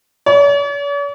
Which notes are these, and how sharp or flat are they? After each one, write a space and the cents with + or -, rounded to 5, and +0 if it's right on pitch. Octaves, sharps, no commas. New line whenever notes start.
C#5 +45